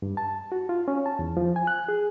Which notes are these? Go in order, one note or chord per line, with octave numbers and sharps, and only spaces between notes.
G2
A5
F#4
F4
C#4
A5
E2
F3
G#5
F#6
G#4